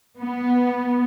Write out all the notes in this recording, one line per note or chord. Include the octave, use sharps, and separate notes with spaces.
B3